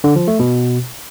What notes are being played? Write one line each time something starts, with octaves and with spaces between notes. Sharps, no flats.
D3
F3
A3
B2